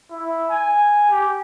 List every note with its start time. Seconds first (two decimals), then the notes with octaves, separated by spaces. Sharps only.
0.11 E4
0.50 G#5
1.11 G4